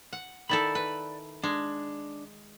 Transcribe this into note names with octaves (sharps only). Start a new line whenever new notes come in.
F#5
D#3 E4 A4 D5 B5
B4
G#3 D4